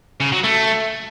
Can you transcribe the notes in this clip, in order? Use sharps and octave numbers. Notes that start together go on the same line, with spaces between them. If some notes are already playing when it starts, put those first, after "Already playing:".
C#3
F#3
A3